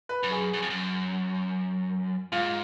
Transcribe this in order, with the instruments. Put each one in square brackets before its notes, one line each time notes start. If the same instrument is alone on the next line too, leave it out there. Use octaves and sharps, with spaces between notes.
[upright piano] B4
[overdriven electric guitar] F#2
[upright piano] G#4
[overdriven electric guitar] F#2
F2
F#2
[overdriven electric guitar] G#2 [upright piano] F4